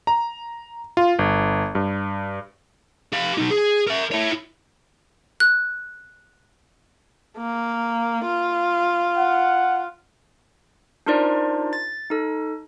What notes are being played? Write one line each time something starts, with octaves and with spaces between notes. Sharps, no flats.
A#5
F4
G1
G2
G4 F5
B1 D#4
G#4
A#4 E5
E4 C#5
F#6
A#3
F4
F#5
D4 D#4 F4 A#4 C5 D5
A6
D#4 A4